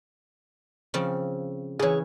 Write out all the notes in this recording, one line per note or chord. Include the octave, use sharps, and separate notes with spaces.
C#3 F3 C4
C#3 E3 G#4 C#5